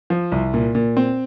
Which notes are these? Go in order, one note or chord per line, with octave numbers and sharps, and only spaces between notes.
F3
C2
A#2
A#2
C4